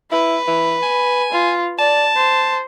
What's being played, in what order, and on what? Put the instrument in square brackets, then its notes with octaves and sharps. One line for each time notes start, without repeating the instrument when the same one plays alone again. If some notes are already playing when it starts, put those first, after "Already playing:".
[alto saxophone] E4 [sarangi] B4
[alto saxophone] E3
G#5
[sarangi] F4
[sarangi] D5 [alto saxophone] A5
[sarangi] C5